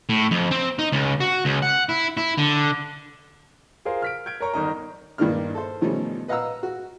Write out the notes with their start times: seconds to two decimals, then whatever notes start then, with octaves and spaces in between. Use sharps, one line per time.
0.09 A2
0.31 F2
0.51 C4
0.79 D#4
0.92 C#2
1.20 F#4
1.45 C#2
1.62 F#5
1.89 E4
2.17 E4
2.38 D3
3.85 F4 G#4 A#4 C5 F5
4.02 F6 B6 D7
4.26 G6 G#6 D7
4.40 A#4 C#5 A#5 C#6
4.54 G1 D#3 D#4 D#5 A#5
5.18 G2 D#3 G3 A#3 D4 F6
5.55 A4 C5
5.81 B2 D#3 F3 G3 A3 C#4
6.28 B4 D#5 F5 F#5 A#5 E6
6.63 F#4